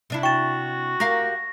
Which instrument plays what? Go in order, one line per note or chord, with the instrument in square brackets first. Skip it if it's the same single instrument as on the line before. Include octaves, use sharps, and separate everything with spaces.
[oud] C3 D4 E4
[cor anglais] F#4 [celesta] G5 A6 [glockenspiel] C#6 E7
[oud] G4 A#4 F5 [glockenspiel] A#6